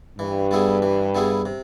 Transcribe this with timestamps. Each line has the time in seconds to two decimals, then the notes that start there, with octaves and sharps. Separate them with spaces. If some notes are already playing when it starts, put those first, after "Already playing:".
0.19 G2 E3
0.51 G3 B3 E4 G#4
0.82 E3
1.15 G3 B3 E4 G#4
1.46 C3